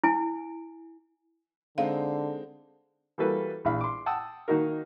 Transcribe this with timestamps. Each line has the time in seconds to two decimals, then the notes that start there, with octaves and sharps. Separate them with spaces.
0.04 E4 G#5
1.78 D3 G#3 C4 D#4 F5
3.18 E3 G3 A#3 F#4 A4 B4
3.65 A#1 E3 F5 B5
3.81 C6 D6
4.06 F#5 G5 A5 D#6 E6
4.48 D#3 A#3 D#4 F#4 A#4